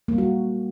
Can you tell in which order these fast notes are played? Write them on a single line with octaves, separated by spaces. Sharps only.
A#3 G3 F#4